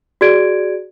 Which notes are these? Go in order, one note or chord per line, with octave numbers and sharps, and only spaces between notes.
F#4 G#4 D5 G#6 D7